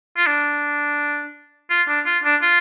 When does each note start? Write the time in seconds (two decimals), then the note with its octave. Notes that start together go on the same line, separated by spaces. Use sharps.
0.17 F4
0.27 D4
1.70 F4
1.88 D4
2.06 F4
2.23 D4
2.42 F4